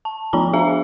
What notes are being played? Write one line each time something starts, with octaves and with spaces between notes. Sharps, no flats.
A5
F3 B3 F4 A#5 B5
D4 G#4 E5 F5 A#5